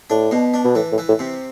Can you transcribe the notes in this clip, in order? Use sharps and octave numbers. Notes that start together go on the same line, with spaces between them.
A2 D4
B2
D4
B2
A2 E3
A2
E3
A2
C3